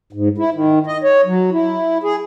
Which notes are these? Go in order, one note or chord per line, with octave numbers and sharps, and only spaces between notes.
G#2
E4
D#3
D#5
C#5
F#3
E4
G#4